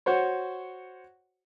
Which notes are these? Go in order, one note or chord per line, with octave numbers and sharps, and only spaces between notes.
F#4 C5 C#5